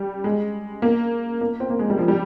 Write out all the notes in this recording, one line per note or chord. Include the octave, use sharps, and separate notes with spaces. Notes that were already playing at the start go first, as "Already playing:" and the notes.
Already playing: G3
G#3
A#3
A#3
C4
A#3
G#3
G3
F3
G3